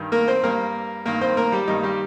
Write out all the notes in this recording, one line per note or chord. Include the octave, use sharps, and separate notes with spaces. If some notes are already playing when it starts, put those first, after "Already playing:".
Already playing: G2 D#3
A#3 A#4
C4 C5
G2 G3 A#3 A#4
G2 D#3 A#3 A#4
C4 C5
A#3 A#4
G3 G4
G2 D#3 G3 A#3 D#4
G3 G4